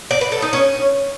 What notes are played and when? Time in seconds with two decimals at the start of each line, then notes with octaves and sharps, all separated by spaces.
0.11 D5
0.21 B4
0.32 A4
0.42 D#4
0.53 C#4